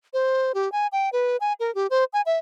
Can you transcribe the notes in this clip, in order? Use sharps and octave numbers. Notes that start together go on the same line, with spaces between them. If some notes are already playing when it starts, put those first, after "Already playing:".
C5
G4
G#5
G5
B4
G#5
A#4
G4
C5
G#5
E5